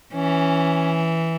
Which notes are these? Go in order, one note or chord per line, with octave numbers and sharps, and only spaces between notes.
E3 C#4